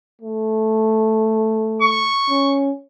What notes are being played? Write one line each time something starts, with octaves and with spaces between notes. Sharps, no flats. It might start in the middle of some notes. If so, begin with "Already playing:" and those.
A3
C#6
C#4